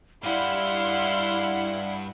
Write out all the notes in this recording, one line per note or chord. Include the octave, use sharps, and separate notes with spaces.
G2 G3 E4 D5 F5 F#5 C6